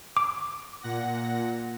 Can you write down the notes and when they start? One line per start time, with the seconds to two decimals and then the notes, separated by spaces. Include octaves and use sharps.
0.17 D6
0.82 A#2 F#5 A#6